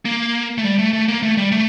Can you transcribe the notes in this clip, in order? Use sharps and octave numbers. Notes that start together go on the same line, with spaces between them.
A#3
A3
G3
A3
A3
A#3
A3
G3
A3